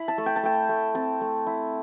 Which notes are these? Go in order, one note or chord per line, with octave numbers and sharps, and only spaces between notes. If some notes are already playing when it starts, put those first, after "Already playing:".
Already playing: E4 B5
A5
A3
G5
A5
A3 G5
A3
C4 A5
A3
E4